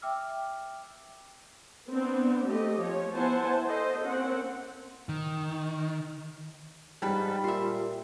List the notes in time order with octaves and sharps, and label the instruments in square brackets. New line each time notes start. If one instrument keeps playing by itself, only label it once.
[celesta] E5 G5 D6 E6 F6
[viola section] B3 C4 D4
A3 G4 D#5
F3 C#5
B3 E4 C5 F#5 G#5 A5
A4 C5 D#5
A#3 C4 C#4 F#5
[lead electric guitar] D#3
[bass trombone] G#2 [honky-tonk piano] G3 [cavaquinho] B4 A5
[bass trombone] A#2 [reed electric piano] F4 G4 [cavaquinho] E5 C6